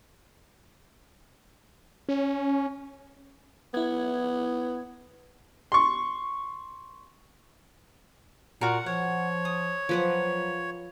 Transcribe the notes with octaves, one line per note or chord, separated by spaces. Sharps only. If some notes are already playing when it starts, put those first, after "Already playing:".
C#4
B3 E4 G#6
C6 C#6
A#2 F#4 A#4 F#5
F3 C#5 F#5
D#6
F3 F#3 B4 F#5